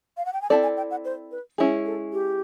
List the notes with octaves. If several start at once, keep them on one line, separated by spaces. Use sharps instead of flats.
F5
F#5
G5
G#5
C4 E4 A4 D5 A5
G#5
G5
F#5
C5
B4
G#3 C#4 E4 G#4
A4
G4